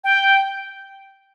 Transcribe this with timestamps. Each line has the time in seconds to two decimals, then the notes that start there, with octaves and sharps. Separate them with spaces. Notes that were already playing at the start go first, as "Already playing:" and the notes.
0.04 G5